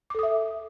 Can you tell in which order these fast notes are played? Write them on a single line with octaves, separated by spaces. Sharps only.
D6 A4 D#6 E5